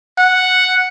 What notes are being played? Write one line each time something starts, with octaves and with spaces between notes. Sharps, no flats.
F#5